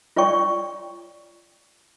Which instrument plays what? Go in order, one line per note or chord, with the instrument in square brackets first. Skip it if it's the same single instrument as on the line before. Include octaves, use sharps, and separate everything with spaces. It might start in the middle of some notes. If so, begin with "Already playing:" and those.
[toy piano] F4 C#5 D5 G5 C#6